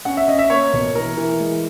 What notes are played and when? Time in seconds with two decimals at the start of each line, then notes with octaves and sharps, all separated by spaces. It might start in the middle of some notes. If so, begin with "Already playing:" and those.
0.05 C#4 F#5
0.17 E5
0.28 C#4 D#5
0.39 E5
0.50 A#3 C#5
0.73 B2
0.95 E3 A#4
1.18 E3
1.40 G#3